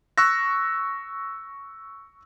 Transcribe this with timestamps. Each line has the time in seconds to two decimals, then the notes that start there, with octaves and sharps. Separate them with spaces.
0.18 C#6 E6 F#6 A#6